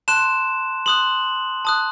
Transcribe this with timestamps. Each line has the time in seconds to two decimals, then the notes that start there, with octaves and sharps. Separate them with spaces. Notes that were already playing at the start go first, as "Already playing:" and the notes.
0.08 A5 C6 F#6 E7
0.86 C6 D#6 F#6 F#7
1.65 A5 D#6 F#6